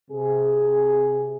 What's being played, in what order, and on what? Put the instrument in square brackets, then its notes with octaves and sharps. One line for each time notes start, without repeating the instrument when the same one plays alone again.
[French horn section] C3 G#4